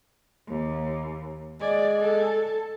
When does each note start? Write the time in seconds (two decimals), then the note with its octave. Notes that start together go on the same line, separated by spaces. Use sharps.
0.48 D#2
1.61 G#3 D5
2.02 A4